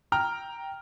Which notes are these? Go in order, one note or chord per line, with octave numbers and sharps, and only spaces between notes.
G5 A#5 F6